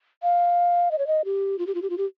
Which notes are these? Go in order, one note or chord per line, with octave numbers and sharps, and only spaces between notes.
F5
D#5
C#5
D#5
G4
F4
G4
F4
G4
F4
G4